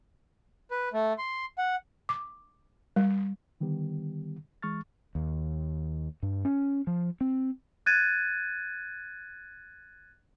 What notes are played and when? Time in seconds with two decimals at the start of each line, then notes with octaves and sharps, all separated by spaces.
0.71 B4
0.93 A3
1.18 C6
1.58 F#5
2.09 D6
2.96 G3
3.61 D3 D#3 G3 B3 G4
4.62 E3 G#3 C#6 F6 A6
5.15 D#2
6.23 G2
6.45 C#4
6.87 F3
7.21 C4
7.86 F#6 G#6 A6 D#7